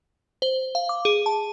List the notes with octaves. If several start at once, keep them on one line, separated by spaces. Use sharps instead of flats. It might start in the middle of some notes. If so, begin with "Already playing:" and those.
C5
F5
D6
G#4
A5